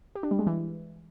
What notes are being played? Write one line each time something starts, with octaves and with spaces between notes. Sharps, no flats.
G4
D4
G3
G#3
E3